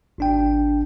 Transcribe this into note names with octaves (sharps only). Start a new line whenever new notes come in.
G#1 D4 G5